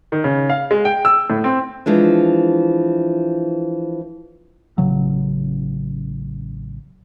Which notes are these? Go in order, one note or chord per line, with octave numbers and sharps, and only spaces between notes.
D#3
C#3
F5
G#3
G5
E6
A2
C4
E3 F3 G#3 D4
A1 C#3 F#3